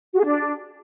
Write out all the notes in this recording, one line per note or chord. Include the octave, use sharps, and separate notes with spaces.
F#4
G#4
D4